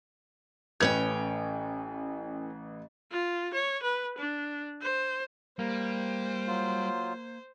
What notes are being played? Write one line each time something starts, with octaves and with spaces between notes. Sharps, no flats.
A1 A2 C#4 B4 G5 G#6
F4
C#5
B4
D4
C5
G3 A#3 C5
F#3 F4